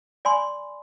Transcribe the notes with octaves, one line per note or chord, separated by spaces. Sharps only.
D5 G#5 B5 C6